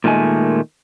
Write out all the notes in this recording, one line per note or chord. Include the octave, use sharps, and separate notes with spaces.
A#2 D#3 G#3 A3 G#5